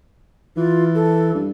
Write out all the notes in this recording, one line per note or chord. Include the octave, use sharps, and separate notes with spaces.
E3 F4
A4
G2